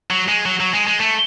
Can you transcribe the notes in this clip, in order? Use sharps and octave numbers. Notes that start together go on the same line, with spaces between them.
F#3
G#3
F#3
F#3
G#3
G#3
A3